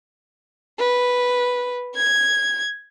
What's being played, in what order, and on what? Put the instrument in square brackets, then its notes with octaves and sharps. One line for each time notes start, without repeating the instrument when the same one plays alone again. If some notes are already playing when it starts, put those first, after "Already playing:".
[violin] B4
G#6